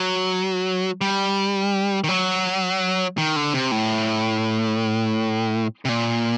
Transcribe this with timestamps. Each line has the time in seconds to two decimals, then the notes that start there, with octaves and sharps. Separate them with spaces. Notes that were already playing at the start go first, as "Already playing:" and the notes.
Already playing: F#3
1.01 G3
2.04 D#3
2.09 F#3
3.18 D#3
3.36 D3
3.54 C3
3.71 A2
5.85 C3
5.89 A#2